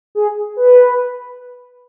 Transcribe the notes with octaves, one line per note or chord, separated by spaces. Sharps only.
G#4
B4